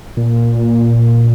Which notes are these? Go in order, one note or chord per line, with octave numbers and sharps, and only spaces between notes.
A#2